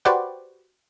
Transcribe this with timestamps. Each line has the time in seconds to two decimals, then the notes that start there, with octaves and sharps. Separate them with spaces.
0.05 F#4 G4 B4 C5 D5 F#5